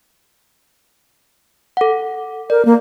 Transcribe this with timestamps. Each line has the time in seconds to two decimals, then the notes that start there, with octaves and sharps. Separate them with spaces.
1.77 A4 F#5
2.50 A#4 D5
2.65 A#3